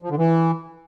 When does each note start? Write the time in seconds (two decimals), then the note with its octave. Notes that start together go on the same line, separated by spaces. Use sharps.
0.02 F3
0.10 D3
0.17 E3